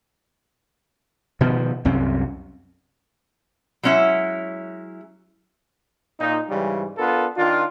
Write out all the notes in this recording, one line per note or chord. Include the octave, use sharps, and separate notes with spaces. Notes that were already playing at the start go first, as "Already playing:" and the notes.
B2 D#3 F3
C2 F#2 C4 C#4
F#3 G#3 C#4 E4 E5
A#2 D#4
G#2 C#3 E3 G3
B3 D4 F4 A4 A#4
D#3 D4 F4